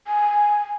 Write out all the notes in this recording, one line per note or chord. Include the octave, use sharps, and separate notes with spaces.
G#5